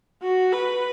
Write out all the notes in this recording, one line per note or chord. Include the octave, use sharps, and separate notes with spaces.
F#4
B4